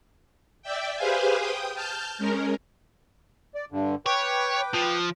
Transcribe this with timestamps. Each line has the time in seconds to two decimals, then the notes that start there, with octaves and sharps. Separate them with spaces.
0.62 D5 E5 G5
0.96 G4 G#4 B4 C5 F5 G#5
1.38 G5 D#6
1.75 A5 F6 G6
2.18 G#3 C#4 A#4
3.55 D5
3.72 G2 D3
4.06 B4 C#5 G5 D6
4.74 F3